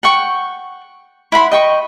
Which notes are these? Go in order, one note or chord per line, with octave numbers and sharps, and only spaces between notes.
F#5 G5 C#6
E4 F#5 B5 C6
D#5 G5 C#6